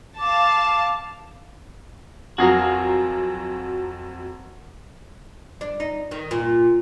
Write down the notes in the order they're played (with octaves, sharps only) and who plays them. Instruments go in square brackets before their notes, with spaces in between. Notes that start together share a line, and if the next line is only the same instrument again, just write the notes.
[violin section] F5 A5 [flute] D6
[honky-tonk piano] F2 F#3 [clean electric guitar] F#4 G#4 A#4
[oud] D4
D#4
D#3
A#2